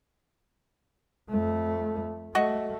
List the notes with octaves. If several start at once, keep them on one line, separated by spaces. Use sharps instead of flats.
F2 A3
A3 F#4 D#5 C#6